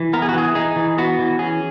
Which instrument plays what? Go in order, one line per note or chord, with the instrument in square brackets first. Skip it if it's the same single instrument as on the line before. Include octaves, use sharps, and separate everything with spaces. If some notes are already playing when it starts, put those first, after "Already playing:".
Already playing: [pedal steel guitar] E3
B3 A#4
G#4
F#4
E3 G#4
D#4 G#4
E3
B3 F#4
E3
C#4 G#4